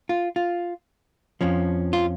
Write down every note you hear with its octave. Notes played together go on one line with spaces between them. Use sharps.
F4
F4
F2 F3 C#4
F4